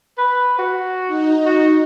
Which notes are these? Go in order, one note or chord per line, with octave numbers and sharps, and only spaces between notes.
B4
F#4
D#4
F#4